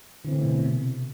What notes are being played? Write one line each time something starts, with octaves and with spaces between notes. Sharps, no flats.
A2 D3 E3 A3 C4
B2
C3